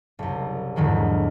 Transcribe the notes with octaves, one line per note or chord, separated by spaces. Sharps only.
F#1 C2
E2 G#2 D3 D#3 F3 F#3